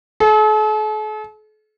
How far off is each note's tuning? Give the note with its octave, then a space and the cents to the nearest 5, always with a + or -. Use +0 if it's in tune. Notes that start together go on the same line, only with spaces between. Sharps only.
A4 -45